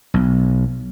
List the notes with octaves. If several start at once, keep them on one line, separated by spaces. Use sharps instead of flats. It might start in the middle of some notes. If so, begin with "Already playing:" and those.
B1